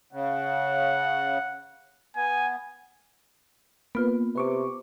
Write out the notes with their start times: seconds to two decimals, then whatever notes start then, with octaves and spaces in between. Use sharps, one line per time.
0.13 C#3 F#5
2.16 B3 G#5
3.95 A#3 B3 F4 B4
4.36 C3 B4 C#6 D6